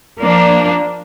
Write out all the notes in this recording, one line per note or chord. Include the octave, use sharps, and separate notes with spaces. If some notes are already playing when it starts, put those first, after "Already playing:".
F3 A#3 D4